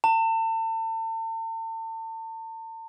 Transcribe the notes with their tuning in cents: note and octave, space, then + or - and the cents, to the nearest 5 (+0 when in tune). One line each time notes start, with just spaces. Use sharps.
A5 +40